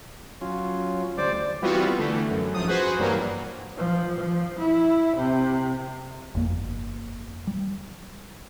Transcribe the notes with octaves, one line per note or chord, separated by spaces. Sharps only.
F#3 C#4 F4
D2 G3 C5 D5 D6
E3 G3 B3 C4 F4 F#4
D3 E3 A3
F#2
G#1 F#2 F3 D#6
F#4 G#4 B4 C5
G2 A#2 E3 F#3 A#3
F3
F3
E4
C3
G1 F2 A#3
G3